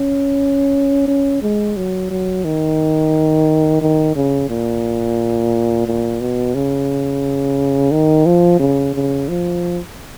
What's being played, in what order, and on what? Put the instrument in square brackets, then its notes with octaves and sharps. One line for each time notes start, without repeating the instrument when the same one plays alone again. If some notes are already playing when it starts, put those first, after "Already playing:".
Already playing: [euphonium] C#4
C#4
G#3
F#3
F#3
D#3
D#3
C#3
A#2
A#2
B2
C#3
D#3
F3
C#3
C#3
F3